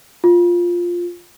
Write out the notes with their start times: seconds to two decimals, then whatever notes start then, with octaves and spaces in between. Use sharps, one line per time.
0.24 F4